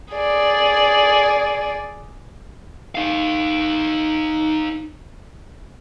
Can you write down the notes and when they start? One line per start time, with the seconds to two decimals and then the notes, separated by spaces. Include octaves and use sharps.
0.14 G#4 D5
2.95 D#4 F5